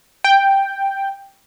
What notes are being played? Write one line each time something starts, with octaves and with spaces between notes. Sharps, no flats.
G5